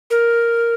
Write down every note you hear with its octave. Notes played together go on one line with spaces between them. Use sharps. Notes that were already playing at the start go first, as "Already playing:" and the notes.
A#4